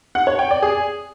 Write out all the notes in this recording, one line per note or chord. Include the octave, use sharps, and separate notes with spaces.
F#5
C#5
G5
D5
G#4